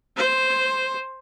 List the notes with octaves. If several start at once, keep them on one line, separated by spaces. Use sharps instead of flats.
C5